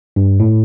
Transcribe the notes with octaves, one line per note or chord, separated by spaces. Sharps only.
G2
A2